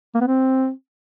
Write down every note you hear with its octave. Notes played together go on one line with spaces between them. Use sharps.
A#3
B3
C4